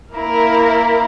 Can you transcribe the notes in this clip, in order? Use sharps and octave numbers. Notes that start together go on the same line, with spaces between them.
A#3 E4 A#4